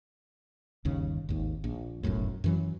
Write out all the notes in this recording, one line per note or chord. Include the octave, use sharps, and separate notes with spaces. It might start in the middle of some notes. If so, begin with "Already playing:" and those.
G1 D#2 C#3
G#1 D#2
A#1
F1 B1 F#2 A2
F#2 E3 F#3